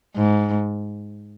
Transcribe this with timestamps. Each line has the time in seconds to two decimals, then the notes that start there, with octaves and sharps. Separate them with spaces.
0.16 G#2